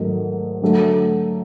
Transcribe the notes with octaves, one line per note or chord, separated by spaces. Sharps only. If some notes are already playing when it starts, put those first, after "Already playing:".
Already playing: G#2 D#3 F#3 A3
D3 F#3 A3